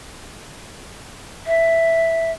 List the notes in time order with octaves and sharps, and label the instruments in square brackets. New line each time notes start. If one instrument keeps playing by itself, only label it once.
[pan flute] E5